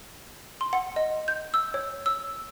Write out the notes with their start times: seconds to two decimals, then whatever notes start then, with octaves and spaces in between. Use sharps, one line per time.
0.61 C6
0.73 F#5
0.96 D#5
1.28 G6
1.54 E6
1.74 C#5
2.06 E6